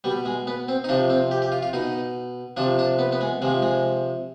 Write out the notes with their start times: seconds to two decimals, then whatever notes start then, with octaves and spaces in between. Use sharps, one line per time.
0.04 B2 G3
0.26 G#3
0.47 B3
0.68 C4
0.84 D#4
0.89 C3 F3 D4
1.10 C4
1.31 G4
1.42 G4
1.52 F4
1.63 F4
1.73 B2 D#4
2.57 C3 F3 D4
2.79 D4
2.99 B3
3.12 B3
3.21 G#3
3.42 C3 F3 G#3
3.62 G#3